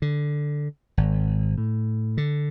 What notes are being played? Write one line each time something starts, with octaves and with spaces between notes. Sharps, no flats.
D3
G#1
A2
D3